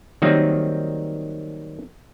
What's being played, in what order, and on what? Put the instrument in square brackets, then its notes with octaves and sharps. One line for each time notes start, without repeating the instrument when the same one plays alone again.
[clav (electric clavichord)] D#3 F#3 G3 A#3 C4 D#4